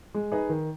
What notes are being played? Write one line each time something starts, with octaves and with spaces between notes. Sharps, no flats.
G#3
D#4 G#4 B4 D#5
D#3